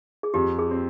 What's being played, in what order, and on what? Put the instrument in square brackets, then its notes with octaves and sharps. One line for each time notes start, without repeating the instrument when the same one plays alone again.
[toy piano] G#4
[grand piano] F2 [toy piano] G4
[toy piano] G#4
[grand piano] C4